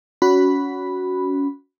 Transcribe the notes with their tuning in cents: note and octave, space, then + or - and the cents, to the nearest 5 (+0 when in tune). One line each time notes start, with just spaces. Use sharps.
C#4 +25 F#4 +0 B5 +0